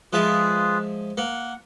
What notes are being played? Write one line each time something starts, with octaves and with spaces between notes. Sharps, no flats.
F3 G#3 F4 G#4 B4 E5
A#3 F#5